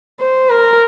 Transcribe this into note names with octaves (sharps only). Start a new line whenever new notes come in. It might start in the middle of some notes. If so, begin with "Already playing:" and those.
C5
A#4